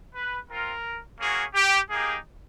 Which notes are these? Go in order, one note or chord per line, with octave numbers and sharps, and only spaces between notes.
B4
C4 F4 A#4
A#3 C#4 F#4 G#4
G4
A#3 D#4 G4 G#4